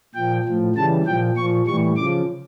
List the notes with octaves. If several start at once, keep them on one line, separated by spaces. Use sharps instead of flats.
A#2 F3 G5
A2 F3
C#3 E3 G3 A5
A#2 F3 G5
A#2 F3 C#6
A2 E3 G3 C#6
C#3 F3 D6